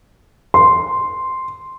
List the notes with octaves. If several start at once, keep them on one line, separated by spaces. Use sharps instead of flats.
C6